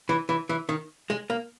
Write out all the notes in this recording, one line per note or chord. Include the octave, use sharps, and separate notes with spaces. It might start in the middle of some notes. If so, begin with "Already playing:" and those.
E3
E3
E3
D#3
G#3
A#3